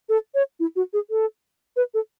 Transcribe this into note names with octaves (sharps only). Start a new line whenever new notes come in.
A4
C#5
E4
F#4
G#4
A4
B4
A4